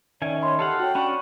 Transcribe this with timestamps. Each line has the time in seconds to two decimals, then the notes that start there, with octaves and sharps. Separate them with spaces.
0.22 D#3 C#4 D5 E5 G#5
0.42 C#5 D#5 B5 C6
0.59 G4 A4 F5 F#5
0.79 F#4 C#5 G5
0.95 C#4 D4 F#5 B5 C#6